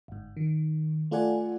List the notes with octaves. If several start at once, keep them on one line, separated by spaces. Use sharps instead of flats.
G1 G#2
D#3
A3 F4 A4 D5 F#5 G#5